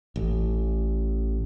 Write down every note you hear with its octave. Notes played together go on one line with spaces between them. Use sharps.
A1